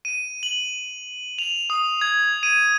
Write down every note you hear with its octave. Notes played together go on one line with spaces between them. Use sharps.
D#7
F#7
F7
D#6
G#6
D#7